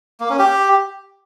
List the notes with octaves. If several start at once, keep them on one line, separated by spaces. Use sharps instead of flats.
A#3
C#4
G4